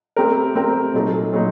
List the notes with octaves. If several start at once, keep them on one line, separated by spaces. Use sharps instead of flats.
A3 C4 G4 A#4
A3 C4 G4 A#4
A#2 F#3 A3 D#4 A4
A#2 F#3 A3 D#4